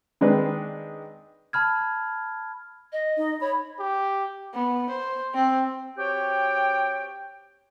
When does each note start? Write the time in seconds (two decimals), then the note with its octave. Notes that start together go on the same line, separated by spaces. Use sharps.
0.21 D#3 G#3 C4 D4 B4
1.53 A5 B5 F6 G#6
2.92 D#5
3.17 D#4
3.41 C#5 B5
3.79 G4
4.54 B3
4.90 C5
5.34 C4
5.98 C4 F#4 G4 C#5 G5